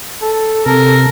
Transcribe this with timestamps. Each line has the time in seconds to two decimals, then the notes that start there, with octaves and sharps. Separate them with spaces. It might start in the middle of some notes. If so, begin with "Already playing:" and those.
0.22 A4
0.66 C3 A4 A#4